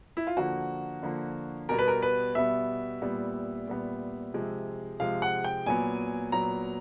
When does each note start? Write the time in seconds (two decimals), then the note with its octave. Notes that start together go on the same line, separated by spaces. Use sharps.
0.17 E4
0.27 F4
0.37 D3 F3 A#3 F#4
1.03 D3 F3 A#3
1.69 B2 G3 B3 A#4
1.79 B4
1.88 A#4
2.02 B4
2.35 B2 G3 B3 E5
3.02 A#2 G3 B3
3.67 A#2 G3 B3
4.34 C3 F3 G#3
5.00 C3 F3 G#3 F5
5.22 F#5
5.44 G5
5.66 A#2 F#3 B3 G#5
6.32 A#2 F#3 B3 A#5